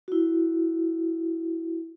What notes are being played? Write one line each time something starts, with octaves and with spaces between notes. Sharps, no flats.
E4 F#4